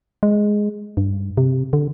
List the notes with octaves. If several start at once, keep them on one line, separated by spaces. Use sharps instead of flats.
G#3
G2
C3
D3